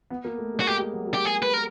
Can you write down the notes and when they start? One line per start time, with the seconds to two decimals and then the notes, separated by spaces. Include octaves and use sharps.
0.10 B3
0.24 A#3
0.38 A3
0.54 G#3
0.60 F#4
0.67 G#3 G4
0.80 G3
0.93 F#3
1.07 G3
1.14 G4
1.25 G#4
1.43 B4
1.54 A#4